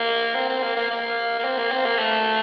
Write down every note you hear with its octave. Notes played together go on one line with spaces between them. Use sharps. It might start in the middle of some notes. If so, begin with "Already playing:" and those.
Already playing: A#3
C4
C4
A#3
A#3
A#3
A#3
C4
A#3
C4
A#3
A3